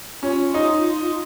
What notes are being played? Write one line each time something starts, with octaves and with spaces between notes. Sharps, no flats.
C#4 F4
D#4